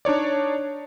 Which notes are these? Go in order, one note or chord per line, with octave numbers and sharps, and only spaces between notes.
D4 D#4 C#5 D5